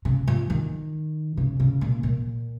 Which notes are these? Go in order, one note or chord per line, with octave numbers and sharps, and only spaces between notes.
C#3
F3
D#3
C#3
C#3
A#2
A#2